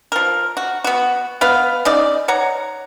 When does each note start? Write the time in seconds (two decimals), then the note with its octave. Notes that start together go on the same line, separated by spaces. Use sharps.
0.12 F3 A#4
0.57 F#4
0.84 B3 F#4
1.41 B3 B4 F5 F#5
1.85 C#3 D#4 D5
2.28 C#5 F#5 A#5